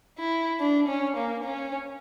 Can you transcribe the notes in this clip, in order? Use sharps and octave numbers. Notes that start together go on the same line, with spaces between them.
E4
D4
C#4
A#3
C#4